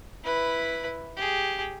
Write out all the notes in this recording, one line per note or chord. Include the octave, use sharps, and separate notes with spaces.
E4 B4
G4 G#4